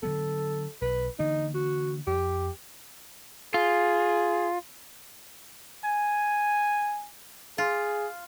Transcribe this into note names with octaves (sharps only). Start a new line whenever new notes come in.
D3 F#3 B3 A4
B1 B4
D3 E3 A#3 D#4
F#4
F2 G4
F4 G#4
G#5
F4 G#4